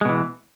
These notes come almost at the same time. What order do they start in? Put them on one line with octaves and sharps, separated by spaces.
G#3 B2 E3